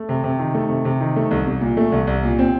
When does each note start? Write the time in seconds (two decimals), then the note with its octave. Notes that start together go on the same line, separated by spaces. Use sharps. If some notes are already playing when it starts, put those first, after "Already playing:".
Already playing: A3
0.09 C3
0.24 C3
0.39 D#3
0.54 A3
0.70 C3
0.85 C3
1.01 D#3
1.16 A3
1.31 C2
1.47 C2
1.61 A#2
1.77 A3
1.92 C2
2.07 C2
2.23 A#2
2.39 C4